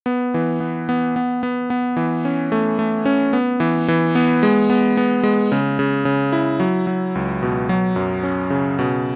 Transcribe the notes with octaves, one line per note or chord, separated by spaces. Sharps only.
B3
E3
B3
B3
B3
B3
B3
E3
C#4
A3
A3
C#4
B3
E3
E3
B3
G#3
B3
B3
G#3
C#3
C#3
C#3
E4
F#3
F#3
C#2
B2
F#3
F#2
C#4
C#3
B2